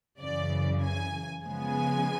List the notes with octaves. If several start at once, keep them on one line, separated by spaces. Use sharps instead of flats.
F#2 C#3 E3 D5
G#5
C#3 F3 G#3 B3 G#5